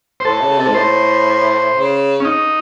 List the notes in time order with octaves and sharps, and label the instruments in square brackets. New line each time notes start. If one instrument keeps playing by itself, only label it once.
[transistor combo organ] C5
[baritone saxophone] A2 [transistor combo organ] A4
[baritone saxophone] C#3
C3
[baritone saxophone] G#2 [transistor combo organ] A4
[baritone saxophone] A2 [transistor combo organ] C5
[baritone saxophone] C#3
[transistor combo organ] C#4
D#4